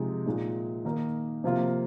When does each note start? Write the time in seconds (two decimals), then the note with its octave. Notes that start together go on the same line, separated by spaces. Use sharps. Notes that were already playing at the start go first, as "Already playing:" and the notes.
Already playing: C3 F3 G#3 D#4
0.26 A#2 G#3 D#4
0.85 D#3 A#3 D#4 A#4
1.44 C3 F3 A#3 F4